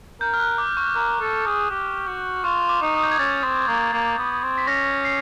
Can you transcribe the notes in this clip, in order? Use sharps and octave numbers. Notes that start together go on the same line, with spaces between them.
A#4 G6
F6
F#6
D6
C#6
A#4
A4
G#4
G4
F#4
F4 C#6
D6
D#4
D#6
G6
G#6
C#4 A6
C4
A#3
A#3
B3
C4
B6
C#4 A#6
C7